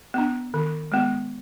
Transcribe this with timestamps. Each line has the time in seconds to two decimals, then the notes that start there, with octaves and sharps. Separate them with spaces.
0.14 B3 D4
0.54 D#3
0.92 G#3 B3